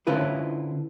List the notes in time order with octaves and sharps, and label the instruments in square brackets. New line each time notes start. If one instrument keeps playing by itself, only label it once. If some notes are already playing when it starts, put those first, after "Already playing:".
[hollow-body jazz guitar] D3 C#4 E4 F4 B4 C5